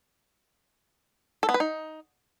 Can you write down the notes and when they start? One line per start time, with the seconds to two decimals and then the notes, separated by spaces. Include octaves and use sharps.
1.43 A4
1.49 B3
1.54 B4
1.60 D#4